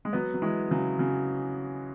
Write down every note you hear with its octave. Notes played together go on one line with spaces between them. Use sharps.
G#3
F#3 B3
F#3
E3 G#3
C#3 F#3
C#3 F#3